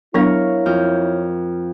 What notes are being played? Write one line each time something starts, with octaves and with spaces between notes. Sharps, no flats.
F#3 B3 D4 E4 A#4 C#5 F5 C#6
F2 F6 G6